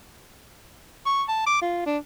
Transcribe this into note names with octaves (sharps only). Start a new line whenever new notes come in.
C#6
A5
D6
F4
D4